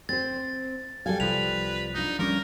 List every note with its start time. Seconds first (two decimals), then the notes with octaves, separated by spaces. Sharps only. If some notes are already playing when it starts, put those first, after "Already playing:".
0.09 C4 C5 A6
1.06 G3 A4 F5 G#5
1.20 C2 F3 B4 F7
1.95 D4 D#4 F4
2.19 F3 G3 C#4 A#4